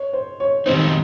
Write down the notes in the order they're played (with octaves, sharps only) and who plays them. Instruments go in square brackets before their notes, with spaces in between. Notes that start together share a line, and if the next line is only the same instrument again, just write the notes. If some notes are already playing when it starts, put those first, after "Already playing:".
Already playing: [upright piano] C#5
C5
C#5
[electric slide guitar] D#3 G3 C4 D#4 [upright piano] C5